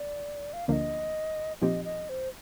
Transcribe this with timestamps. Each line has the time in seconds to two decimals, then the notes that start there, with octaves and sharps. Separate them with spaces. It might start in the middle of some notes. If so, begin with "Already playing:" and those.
Already playing: D5
0.53 F5
0.68 D2 D3 F3 A#3 D4 D#5 F5
1.61 A#2 F3 C4 D#4 G4 D#5
1.85 D#5
2.09 C5